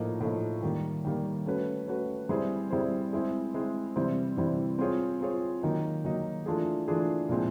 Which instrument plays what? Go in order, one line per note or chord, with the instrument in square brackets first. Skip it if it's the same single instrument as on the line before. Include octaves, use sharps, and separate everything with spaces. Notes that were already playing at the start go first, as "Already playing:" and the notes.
Already playing: [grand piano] A2 F3 A#3 D#4
A2 F3 A#3 D#4
D#3 G3 A#3
D#3 G3 A#3
A3 C#4 F#4 B4
A3 C#4 F#4 B4
G3 C4 E4 G#4 C5
G3 C4 E4 G#4 C5
G#3 C4 E4 G#4
G#3 C4 E4 G#4
C3 E3 G3 C4 E4
C3 E3 G3 C4 E4
C4 F4 G#4 C#5
C4 F4 G#4 C#5
D#3 F#3 A#3 D#4
D#3 F#3 A#3 D#4
E3 A3 D4 F4 G#4
E3 A3 D4 F4 G#4
A#2 F3 G#3 C4 E4